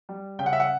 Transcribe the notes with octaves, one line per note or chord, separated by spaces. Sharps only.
G3
C#3 G5
F#5
E5
F#5